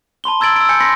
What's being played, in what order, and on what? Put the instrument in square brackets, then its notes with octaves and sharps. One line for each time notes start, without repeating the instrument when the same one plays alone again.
[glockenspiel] A5 B5 C6 G7
A#5 E6 G#6 A6 D7 F#7
E6 D7
G#5 E6 G6 C#7
B5 C6 A#6 B6 C#7